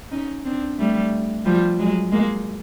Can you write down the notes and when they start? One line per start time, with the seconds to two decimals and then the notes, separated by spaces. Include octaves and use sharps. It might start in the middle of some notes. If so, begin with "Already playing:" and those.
0.12 C#4 D#4
0.45 C4 D4
0.78 G3 A3
1.45 F3 G3
1.78 F#3 G#3
2.12 G#3 A#3